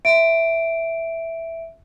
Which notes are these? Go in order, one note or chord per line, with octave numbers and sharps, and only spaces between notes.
E5 D7